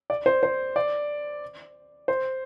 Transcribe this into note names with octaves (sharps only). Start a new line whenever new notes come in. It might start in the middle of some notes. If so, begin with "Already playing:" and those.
D5
C5
C5
D5
C5